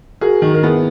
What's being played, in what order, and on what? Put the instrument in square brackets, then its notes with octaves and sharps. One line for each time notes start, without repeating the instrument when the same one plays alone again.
[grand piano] F#4 A#4 [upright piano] G#4
[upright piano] D#3
[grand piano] A#4
[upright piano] B3 [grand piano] E4 G#4